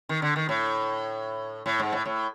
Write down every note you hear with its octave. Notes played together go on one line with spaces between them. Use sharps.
D#3
D3
D#3
A2
A2
G#2
A2
A2